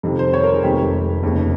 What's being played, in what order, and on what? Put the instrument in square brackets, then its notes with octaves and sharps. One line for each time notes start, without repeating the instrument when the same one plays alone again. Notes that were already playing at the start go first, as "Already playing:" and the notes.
[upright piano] F2 C3 D#3
C5
C#5
A#4
G#4
F1 F2 D#3 G#3 G4
F1 D#2 C#3